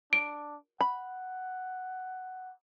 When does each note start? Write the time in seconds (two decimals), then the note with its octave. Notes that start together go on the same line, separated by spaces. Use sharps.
0.13 D4 D7
0.81 F#5 B5